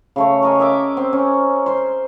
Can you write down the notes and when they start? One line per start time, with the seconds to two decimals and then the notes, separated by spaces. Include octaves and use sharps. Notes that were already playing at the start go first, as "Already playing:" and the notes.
0.16 C#3 A3 C#5
0.42 A#4 D#5 G#5
0.59 D#5 E5 D6
0.97 C4
1.13 C#4
1.66 C5 C6